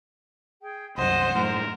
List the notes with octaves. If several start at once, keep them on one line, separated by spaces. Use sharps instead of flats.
G#4 G5
C2 F#2 C5 D#5 F#5
F#2 A2 A#4